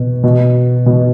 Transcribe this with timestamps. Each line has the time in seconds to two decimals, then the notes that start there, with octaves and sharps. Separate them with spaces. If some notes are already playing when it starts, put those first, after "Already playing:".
Already playing: B2
0.23 B2
0.86 B2